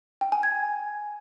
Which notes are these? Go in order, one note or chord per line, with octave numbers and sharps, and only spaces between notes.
G5
G#5
G#6